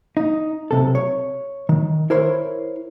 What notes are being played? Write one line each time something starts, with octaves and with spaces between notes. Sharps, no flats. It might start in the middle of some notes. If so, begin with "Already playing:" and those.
D#4
B1 C3 A4
C#5
D#3
E4 A#4 C5 C#5